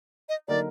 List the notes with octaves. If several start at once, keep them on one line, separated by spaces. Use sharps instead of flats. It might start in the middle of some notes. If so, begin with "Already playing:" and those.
D#5
D3 F#3 A#3 D#4 A#4 D5